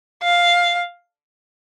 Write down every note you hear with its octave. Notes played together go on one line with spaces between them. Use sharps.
F5